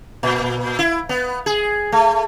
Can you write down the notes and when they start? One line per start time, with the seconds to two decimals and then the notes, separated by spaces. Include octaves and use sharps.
0.23 A#2
0.79 E4
1.09 B3
1.46 G#4
1.92 A3